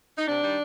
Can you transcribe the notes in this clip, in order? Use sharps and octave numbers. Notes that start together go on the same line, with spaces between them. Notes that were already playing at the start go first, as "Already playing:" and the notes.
D#4
C3 D4
D#3 G3